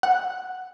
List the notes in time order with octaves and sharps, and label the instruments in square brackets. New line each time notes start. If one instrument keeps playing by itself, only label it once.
[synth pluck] F#5